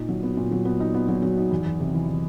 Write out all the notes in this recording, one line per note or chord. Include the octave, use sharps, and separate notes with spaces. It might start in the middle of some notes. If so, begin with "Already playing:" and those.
Already playing: A#2 D#4
F#3
B3
A#2
F#3
B3
D#4
B3
F#3
F#3
D#4
E2
E2
C3
E3
E3